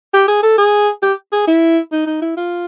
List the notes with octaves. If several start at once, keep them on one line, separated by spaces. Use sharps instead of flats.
G4
G#4
A4
G#4
G4
G#4
E4
D#4
D#4
E4
F4